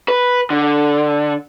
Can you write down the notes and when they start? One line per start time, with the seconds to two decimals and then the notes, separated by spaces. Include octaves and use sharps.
0.08 B4
0.50 D3